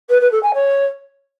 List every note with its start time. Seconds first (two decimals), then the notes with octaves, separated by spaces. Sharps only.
0.09 B4
0.21 B4
0.32 A4
0.43 G#5
0.54 C#5